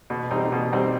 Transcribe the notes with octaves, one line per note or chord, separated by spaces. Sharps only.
B2
G3 C4 D#4
B2
G3 C4 D#4